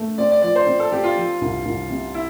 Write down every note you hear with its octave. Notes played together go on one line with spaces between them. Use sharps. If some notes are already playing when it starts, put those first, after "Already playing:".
Already playing: A3
C4 D5
D5
F3 D5
C5
C4
A4
C4 G4
F4
F3
C2
C2
C3
E4